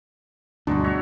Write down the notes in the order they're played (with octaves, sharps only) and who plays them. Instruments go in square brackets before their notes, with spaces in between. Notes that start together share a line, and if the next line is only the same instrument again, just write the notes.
[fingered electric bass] D2 G2 B2 [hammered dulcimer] G#3 D#4 F#4 [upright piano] D4
[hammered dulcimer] F#4 C#5 E5